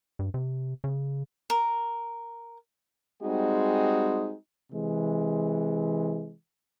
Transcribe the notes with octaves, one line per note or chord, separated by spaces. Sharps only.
G2
C3
C#3
A#4
G3 G#3 C4 D#4 F#4 G#4
C3 E3 G#3